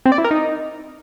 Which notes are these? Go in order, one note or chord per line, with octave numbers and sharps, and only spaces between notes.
C4
D5
E4
A#4
D#4